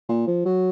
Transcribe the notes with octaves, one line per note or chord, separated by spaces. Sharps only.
A#2
F3
F#3